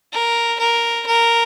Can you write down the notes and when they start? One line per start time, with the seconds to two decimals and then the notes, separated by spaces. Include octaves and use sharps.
0.12 A#4
0.59 A#4
1.06 A#4